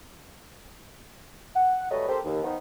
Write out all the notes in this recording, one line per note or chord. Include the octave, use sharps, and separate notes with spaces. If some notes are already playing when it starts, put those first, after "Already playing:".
F#5
F#3 G3 A3 B4 C#5 D#5
C4 G4 A4 A#4 C5
D#2
D#3 F3 B3 D#4